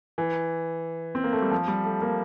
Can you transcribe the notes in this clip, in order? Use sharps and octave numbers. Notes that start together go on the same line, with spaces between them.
E3
C4
A#3
A3
G3
F3
G3
A3
A#3